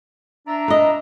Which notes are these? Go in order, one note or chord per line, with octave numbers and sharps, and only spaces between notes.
D4 E5 A#5
B4 D#5